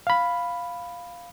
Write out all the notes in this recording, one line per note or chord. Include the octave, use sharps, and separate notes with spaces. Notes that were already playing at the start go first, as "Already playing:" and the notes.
F5 B5